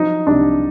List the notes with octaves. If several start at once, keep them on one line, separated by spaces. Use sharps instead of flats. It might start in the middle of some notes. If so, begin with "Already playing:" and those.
Already playing: F3 F#3 D#4
C2 D4